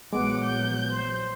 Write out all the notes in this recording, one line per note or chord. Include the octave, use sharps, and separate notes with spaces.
A#1 E3 F#3 G#3 B3 F#5 D6
G6
C5